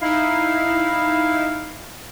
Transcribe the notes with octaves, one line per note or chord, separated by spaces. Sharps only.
D#4 E4 F5